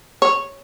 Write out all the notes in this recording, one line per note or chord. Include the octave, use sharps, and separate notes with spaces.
C#5